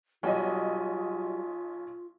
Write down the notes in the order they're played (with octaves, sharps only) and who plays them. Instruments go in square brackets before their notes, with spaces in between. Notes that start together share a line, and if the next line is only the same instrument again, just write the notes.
[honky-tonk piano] B1 D#5 [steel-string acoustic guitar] F#3 G3 [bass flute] F4